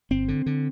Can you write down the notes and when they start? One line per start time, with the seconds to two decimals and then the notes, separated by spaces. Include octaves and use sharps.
0.11 G1 C4
0.28 D3
0.46 D3